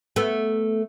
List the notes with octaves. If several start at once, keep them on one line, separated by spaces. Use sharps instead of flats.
A3 B3